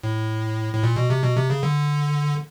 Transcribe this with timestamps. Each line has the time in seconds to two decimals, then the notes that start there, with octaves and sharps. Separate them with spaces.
0.04 A2
0.74 A2
0.83 A#2
0.96 B2
1.10 C3
1.23 B2
1.36 C3
1.50 C#3
1.63 D3